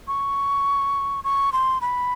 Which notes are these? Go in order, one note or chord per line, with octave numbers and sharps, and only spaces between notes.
C#6
C#6
C6
B5